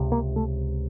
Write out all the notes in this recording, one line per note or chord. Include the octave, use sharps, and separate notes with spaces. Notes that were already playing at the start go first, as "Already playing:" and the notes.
Already playing: C#2 C3
A#3
A3